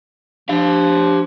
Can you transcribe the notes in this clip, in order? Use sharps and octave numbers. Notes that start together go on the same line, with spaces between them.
F3 D4 G4 F5